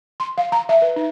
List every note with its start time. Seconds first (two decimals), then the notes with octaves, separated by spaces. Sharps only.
0.20 C6
0.38 F5
0.52 A#5
0.69 E5
0.82 B4
0.96 D#4